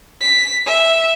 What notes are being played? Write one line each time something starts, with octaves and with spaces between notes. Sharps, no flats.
B6
E5